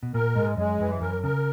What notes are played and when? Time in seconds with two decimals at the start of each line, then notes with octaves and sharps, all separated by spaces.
0.03 B2
0.14 A#2 A#4
0.35 G#2 G#3
0.57 F#2 G#3
0.80 F#2 E3
1.01 F#2 A#4
1.23 C#3 A#4